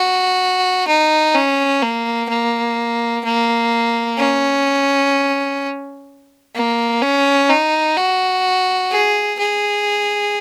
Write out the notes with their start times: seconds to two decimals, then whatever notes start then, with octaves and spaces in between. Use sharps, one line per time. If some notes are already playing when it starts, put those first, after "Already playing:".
Already playing: F#4
0.87 D#4
1.35 C#4
1.82 A#3
2.29 A#3
3.24 A#3
4.18 C#4
6.55 A#3
7.02 C#4
7.49 D#4
7.97 F#4
8.91 G#4
9.39 G#4